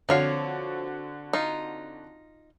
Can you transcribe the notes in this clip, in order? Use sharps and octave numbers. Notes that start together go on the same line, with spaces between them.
D3 F3 C4 F#4 C#5 F5
D#4 F4